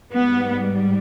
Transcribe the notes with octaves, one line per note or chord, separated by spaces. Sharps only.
G#2 G3 B3